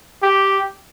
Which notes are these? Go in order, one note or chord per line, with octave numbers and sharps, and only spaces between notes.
G4